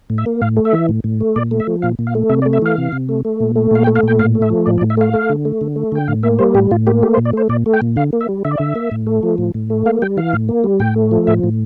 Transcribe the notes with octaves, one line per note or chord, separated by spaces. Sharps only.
A2
E5
A#3
A2 F5
A3
E5
E3
A2
A2
A3
A#2 D5
A3
E5
F3
A#2 F5
A#2
F5
A3
C3 E5
D5
A3
E5
E3 F5
C3
C3
A3
A3
A#2
A3
A#2 F5
G5
A3
F5
A#2 G5
A2 F5
A3
E5
F3
A2 D5
D5
A2
E5
A3 F5
A3
D3
A3
D3
A3
D3 G5
A2 F5
A#3 E5
G3 C5
A2 G4
A2 F4
A#3 G4
A3 G4
C5
A#2
D5
A3 C5
A#2 D5
A3
G5
A#2
D3 F5
A#3
E5
G3
D3 E5
D5
D3 E5
A#3
A2
A3
F3
A2
A2
A3
A#3 F5
G3 G5
E3 F5
A2
A#3
G3
A2 G5
A3
F3
A2 E5
A2